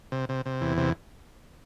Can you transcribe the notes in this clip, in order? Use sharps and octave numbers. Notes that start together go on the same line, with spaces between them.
C3
C3
C3
E2
C3